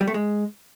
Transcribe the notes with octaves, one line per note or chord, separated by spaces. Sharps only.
G3
A3
G#3